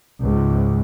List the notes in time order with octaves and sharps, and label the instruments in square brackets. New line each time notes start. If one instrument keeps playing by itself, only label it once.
[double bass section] C#2 G#2